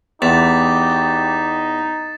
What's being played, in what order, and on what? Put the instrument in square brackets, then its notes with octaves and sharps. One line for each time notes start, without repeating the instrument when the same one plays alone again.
[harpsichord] E2 [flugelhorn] D#4 [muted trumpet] G4 [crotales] A6 B6 E7